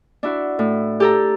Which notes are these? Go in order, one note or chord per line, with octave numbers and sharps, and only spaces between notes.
D4 E4 F#4
A2
G4 A4 A#5